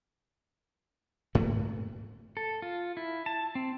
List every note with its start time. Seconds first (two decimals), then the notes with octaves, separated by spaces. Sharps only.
1.35 G#2 A3 A#3
2.37 A4
2.62 F4
2.97 E4
3.26 A5
3.55 C4